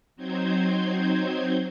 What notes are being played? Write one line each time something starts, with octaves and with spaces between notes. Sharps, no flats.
F#3 C4 D#4 C5 G6 G#6